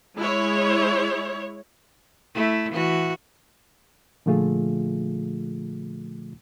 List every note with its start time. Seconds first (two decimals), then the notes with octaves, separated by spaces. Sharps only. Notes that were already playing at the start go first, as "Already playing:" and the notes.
0.19 G#3 E4 C#5
2.35 A3 E4
2.72 E3 F#4
4.26 A#2 D3 F3 A3 F4 G#4